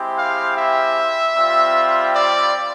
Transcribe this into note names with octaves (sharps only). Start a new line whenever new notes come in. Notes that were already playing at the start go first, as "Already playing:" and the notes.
Already playing: G#3 C4 E4 G4
F5
E5
G3 C4 F4
D5